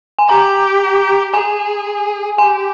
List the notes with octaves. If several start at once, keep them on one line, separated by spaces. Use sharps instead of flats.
G#5
G4 A#5
G#4 G#5
G4 G#5